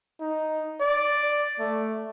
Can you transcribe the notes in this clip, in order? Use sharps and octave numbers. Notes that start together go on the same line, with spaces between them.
D#4
D5
A3